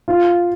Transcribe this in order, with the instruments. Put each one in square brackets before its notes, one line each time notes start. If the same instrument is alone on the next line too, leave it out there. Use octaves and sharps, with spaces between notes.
[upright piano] F4